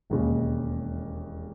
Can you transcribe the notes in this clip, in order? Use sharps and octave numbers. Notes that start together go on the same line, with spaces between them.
E1 D#2 C#3 G#3